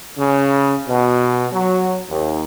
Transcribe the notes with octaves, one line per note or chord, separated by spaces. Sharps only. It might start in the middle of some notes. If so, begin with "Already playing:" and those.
C#3
B2
F#3
D#2